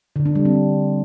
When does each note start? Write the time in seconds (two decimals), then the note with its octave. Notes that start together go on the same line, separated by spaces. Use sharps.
0.16 D3
0.26 D4
0.35 G3
0.45 C4